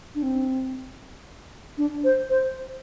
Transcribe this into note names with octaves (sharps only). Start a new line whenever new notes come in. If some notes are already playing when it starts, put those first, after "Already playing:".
D4
C4
D4
C5
C5